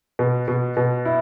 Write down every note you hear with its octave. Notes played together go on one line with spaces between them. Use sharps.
B2
B2
B2
E4